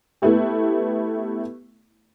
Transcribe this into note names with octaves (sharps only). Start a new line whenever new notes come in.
A3 B3 E4 G4